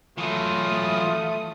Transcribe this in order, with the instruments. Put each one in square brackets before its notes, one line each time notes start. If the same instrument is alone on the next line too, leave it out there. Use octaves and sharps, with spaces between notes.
[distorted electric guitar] E3 F#3 [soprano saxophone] A3 [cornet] F4 [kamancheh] D#6